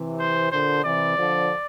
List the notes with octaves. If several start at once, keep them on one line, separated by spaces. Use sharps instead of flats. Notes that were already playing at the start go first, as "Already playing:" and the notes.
Already playing: C3 E3
C5
A#2 D3 C5
C3 E3 D5
D3 F3